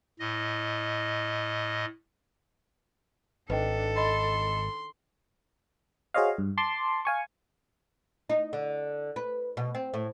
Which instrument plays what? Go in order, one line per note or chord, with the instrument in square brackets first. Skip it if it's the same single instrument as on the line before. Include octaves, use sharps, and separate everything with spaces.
[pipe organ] A2 D#5
[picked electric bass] G#1 [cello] D#3 A4 [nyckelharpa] D4 [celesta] B4 D#5 G5
[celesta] D#5 B5 A6 [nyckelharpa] C6
[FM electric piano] F#4 G#4 C5 C#5 D#5 F5
G2
A5 C6 D6
F5 G#5 C#6
[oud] D#4
D3
B4
B2
C4
A2